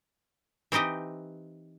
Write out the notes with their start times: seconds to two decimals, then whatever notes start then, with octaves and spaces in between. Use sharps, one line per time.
0.72 E3 C4 D#4 G4 D#5